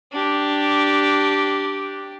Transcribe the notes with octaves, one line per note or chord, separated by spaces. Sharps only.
D4 G4